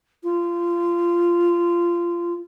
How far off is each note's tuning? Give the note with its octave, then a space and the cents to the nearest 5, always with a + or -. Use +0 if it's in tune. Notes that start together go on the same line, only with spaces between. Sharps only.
F4 -20